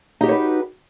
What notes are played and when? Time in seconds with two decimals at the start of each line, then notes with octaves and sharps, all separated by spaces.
0.21 D#4
0.23 G4
0.26 F#4
0.29 C#5
0.31 B4